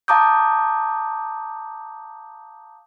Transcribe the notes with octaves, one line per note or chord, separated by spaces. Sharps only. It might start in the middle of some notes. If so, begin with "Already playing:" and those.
F5 A5 A#5 D6 D#6 G6